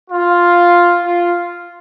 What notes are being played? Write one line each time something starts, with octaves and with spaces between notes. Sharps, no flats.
F4
F4